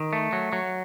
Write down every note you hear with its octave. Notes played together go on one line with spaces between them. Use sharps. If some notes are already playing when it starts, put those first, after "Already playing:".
Already playing: D#3
A3
F#3
F#3